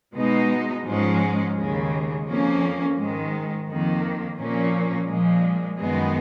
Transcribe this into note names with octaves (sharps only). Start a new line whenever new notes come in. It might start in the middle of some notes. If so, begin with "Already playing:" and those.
B2 G#3 D#4
G#2 F3 G#3 C#4
D#2 C#3 G#3
F2 F3 A#3 C#4
G#2 D#3 G#3
F2 D#3 A#3
A#2 F3 A#3 C#4
A#2 F3 G#3
F#2 D#3 G#3 B3